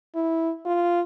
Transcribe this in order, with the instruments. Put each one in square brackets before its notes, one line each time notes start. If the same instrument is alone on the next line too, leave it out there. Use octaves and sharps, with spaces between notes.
[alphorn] E4
F4